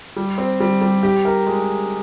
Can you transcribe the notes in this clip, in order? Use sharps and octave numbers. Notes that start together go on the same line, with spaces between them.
G3
C4
G3
G3
G4
A#4
G#3